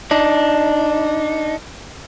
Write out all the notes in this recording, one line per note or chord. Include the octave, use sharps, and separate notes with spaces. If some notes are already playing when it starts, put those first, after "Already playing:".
D4 D#4